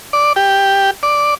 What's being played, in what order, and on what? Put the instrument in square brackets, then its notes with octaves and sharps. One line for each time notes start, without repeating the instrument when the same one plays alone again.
[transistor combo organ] D5
G4
D5